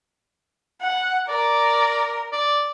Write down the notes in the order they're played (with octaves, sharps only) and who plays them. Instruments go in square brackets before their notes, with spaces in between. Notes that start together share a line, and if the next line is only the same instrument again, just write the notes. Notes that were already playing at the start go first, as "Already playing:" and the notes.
[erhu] F#5
[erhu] A#4 [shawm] D5
[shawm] D5